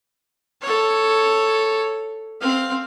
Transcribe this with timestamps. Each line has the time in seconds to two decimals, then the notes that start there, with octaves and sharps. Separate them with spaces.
0.61 A4 C#5
2.41 C4 F5